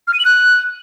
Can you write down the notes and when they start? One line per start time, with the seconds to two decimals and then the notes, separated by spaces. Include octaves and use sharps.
0.08 F6
0.14 D#7
0.19 F#7
0.25 F#6